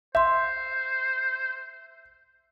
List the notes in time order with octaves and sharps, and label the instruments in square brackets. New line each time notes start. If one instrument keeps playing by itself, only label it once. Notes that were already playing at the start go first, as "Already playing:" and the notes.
[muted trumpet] C5 [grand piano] E5 [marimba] C6 G6